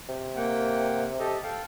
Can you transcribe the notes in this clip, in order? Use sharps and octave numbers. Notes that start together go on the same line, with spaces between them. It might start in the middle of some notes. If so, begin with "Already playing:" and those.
C3
A#3 F#5 G5
G4 A4 D#5
A4 F5 G5